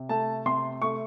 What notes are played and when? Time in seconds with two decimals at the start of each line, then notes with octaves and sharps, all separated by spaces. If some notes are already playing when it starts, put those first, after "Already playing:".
Already playing: C3
0.09 A3 A5
0.46 C3 C6
0.82 A3 C#6